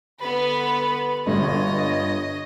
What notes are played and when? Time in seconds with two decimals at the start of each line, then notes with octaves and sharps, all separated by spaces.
0.20 G2 D3 B3 B4 B5
1.26 G1 G2 D3 F4 C#5 D#5